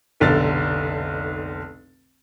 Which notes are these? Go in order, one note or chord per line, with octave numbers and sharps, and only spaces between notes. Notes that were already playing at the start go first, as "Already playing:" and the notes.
F1 B1 D3 A6